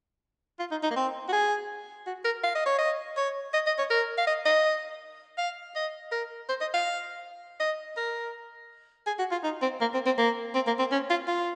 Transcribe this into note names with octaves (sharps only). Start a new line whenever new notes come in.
F4
D#4
D#4
A#3
C4
F#4
G#4
F#4
A#4
F5
D#5
C#5
D#5
C#5
D#5
D#5
C#5
A#4
F5
D#5
D#5
F5
D#5
A#4
C5
D#5
F5
D#5
A#4
G#4
F#4
F4
D#4
C4
A#3
C4
C4
A#3
C4
A#3
C4
C#4
F4
F4